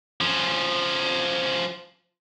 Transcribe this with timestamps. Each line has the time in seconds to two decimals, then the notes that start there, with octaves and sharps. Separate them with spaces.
0.21 F3 C#4